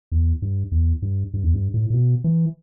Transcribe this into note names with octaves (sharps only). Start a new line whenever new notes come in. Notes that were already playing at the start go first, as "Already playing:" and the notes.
E2
G2
E2
G2
G2
E2
G2
A2
A2
B2
E3